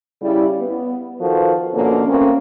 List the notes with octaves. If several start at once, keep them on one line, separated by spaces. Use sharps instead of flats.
C#3 G3 E4
B3
D#3 F3 F#4 A4 B4 C5
B2 D3 F3 A#3 C#4
A3 A#3 C4 C#4